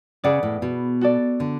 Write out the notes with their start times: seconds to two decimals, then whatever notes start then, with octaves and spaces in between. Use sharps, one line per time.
0.24 C#3 G#4 B4 D5 F#5
0.43 A2
0.62 B2
1.01 F#4 A4 D5
1.40 D3